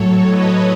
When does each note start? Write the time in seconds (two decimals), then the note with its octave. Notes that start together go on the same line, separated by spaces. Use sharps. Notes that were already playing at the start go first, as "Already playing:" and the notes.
Already playing: A2 F#3 A4 C#5
0.27 B4 D#5